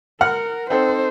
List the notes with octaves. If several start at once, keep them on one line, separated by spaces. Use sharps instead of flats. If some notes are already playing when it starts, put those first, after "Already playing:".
A#4 F#5 F6 F#6
C4 D#4 A4 C5